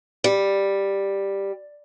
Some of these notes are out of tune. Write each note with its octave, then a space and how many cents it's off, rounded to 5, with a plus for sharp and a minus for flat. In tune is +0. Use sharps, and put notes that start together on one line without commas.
G3 +5